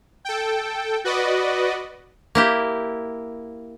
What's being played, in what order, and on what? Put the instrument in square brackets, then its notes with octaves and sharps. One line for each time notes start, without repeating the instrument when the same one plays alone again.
[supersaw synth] A4 G5
F#4 B4 D5 D#5
[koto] A#3 E4 G4